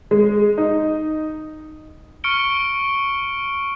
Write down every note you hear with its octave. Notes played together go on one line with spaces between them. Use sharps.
G#3
D#4
C#6 F6 C#7 D7 G7